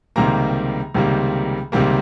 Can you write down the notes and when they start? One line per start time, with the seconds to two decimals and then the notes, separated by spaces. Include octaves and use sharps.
0.16 C#2 C3 D#3 G3 A#3 A#5
0.94 C#2 C3 D#3 G3 A#3
1.72 C#2 C3 D#3 G3 A#3